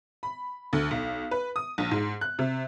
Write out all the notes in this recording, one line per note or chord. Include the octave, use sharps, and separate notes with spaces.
B5
D2
B1
B4
D#6
A#1
G#2
F#6
C3